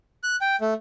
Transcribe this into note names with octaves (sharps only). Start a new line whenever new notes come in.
F#6
G5
A3